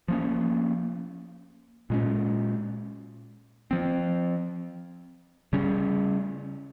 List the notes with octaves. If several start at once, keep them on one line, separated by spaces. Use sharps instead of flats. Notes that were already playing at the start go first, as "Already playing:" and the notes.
F3 A#3 C#4
A#2 G#3 C#4
F3 C4
C#3 G3 C#4